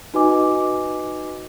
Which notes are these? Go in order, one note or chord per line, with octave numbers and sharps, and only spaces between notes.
D#4 F#4 B4 D#5 G#5 D6